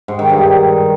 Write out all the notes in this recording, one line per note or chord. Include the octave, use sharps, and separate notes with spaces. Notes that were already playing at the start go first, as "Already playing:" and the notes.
G#2
D#3
G2